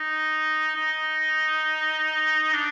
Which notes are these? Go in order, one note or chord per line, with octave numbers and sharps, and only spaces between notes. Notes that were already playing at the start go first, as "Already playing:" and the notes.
Already playing: D#4
D#4
D4